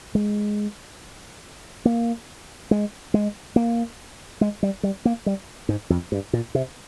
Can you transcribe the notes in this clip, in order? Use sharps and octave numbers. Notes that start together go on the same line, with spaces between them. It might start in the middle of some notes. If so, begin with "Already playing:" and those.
G#3
A#3
G#3
G#3
A#3
G#3
G3
G3
A#3
G3
G#2
F2
G2
A#2
C3